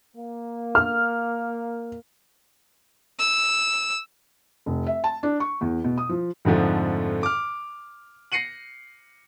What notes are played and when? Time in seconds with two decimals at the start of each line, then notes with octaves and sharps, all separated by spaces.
0.16 A#3
0.75 F6
3.19 E6
4.66 F1
4.87 E5
5.04 A5
5.23 D4
5.40 C#6
5.61 E2
5.84 B2
5.98 D#6
6.09 F3
6.45 F2 G#2 D3 F3 A3
7.23 D6 F6
8.32 A#6 C7 C#7 D#7 F#7